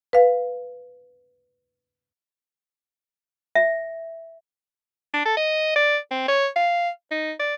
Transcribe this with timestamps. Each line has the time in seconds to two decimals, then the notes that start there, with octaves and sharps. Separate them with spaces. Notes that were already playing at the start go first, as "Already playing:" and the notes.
0.13 B4 F5
3.55 E5
5.14 D4
5.25 A4
5.37 D#5
5.76 D5
6.11 C4
6.28 C#5
6.56 F5
7.11 D#4
7.39 D5